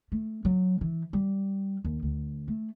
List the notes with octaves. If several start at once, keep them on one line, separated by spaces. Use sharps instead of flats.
A3
F#3
E3
G3
D#2
D2
A3